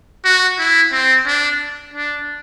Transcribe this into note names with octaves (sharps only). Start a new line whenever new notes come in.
F#4
E4
C4
D4
D4